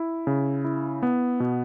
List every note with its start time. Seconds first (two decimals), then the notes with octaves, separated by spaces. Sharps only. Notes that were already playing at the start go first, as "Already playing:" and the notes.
Already playing: E4
0.27 C#3
0.65 E4
1.03 B3
1.40 B2